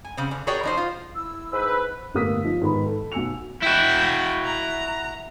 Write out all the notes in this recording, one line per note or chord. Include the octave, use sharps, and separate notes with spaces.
G#5
C#3 C4
D3
F#4 G#4 A#4 C#5 D5 G5
F3 D#4 C5
F4
E4 E6
G#2 B4
G1 A2 A#3 D#6 E6 B6
F3 D#4
G#2 D#3 B3 B5
A4
B1 F#4 G#5 E6 C#7 F7
E4 F#4 G5
A#5